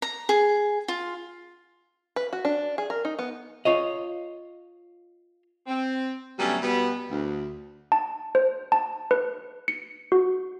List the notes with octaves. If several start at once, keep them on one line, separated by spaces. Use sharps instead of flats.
A#5
G#4
F4
B4
F#4
D4
G#4
A#4
D#4
B3
F4 C#5 D#5
C4
B2 D3 F#3 G3 A3 C#4
B2 G3 B3
D2
A5
C5
A5
B4
C#7
F#4